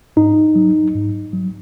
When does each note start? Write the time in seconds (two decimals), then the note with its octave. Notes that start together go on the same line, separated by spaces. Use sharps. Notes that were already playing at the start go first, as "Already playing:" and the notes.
0.16 G#2 D#4
0.55 F#3
0.94 G#2
1.33 F#3